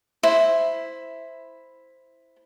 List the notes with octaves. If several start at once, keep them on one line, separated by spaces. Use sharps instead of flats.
E4 C5